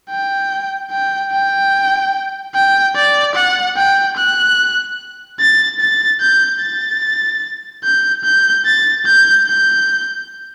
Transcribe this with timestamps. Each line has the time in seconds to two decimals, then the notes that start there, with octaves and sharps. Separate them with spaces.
0.10 G5
0.91 G5
1.32 G5
2.54 G5
2.95 D5
3.35 F#5
3.77 G5
4.17 F#6
5.40 A6
5.80 A6
6.21 G6
6.61 A6
7.84 G6
8.24 G6
8.65 A6
9.06 G6
9.47 G6